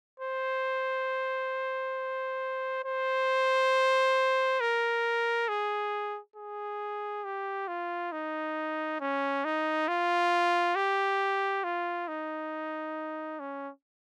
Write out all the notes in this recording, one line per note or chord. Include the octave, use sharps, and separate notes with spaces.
C5
C5
A#4
G#4
G#4
G4
F4
D#4
C#4
D#4
F4
G4
F4
D#4
C#4